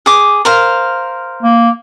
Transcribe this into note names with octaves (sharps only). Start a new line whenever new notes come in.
G#4 D6
A#4 C5 F5
A#3